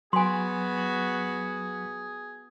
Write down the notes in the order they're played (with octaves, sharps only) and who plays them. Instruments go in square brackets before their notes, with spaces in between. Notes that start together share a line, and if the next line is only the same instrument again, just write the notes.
[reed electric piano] F#3 [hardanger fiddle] B3 F#4 [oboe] G#4 [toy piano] G#5 C6